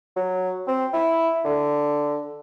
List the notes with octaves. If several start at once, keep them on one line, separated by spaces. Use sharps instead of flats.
F#3
C4
E4
D3